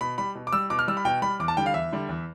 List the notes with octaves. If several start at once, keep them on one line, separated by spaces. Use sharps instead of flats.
B2 B5
G3 B5
B2
D6
G3 E6
B2 D6
F6
G3 E6
B5
B2 G5
G3 B5
E2 D6
A5
D3 G3 G5
F5
E2 E5
D3 G3
E2